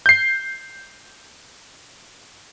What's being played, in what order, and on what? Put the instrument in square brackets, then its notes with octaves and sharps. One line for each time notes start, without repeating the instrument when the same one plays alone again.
[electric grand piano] G6 C7